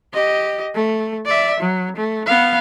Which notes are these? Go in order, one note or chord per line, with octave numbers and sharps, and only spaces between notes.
G4 D#5
A3
D5 E5
F#3
A3
B3 F5